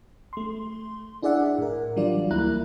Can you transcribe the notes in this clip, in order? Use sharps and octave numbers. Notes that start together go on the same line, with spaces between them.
A3 C6
D4 E4 G#4 D5 E5 F#5
A2 A#4
E3 F#3 G3 D4 F4 D5
D2 A#3 E4 A#5 F#6